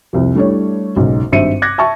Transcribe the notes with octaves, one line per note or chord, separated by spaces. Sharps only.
C2 F2
G3 A3 D4 E4 C#5
F#1 B1 G#2
G#1 G2 C5 E5 C#7 D#7
D6 F#6 G#6 A#6
E5 A5 C#6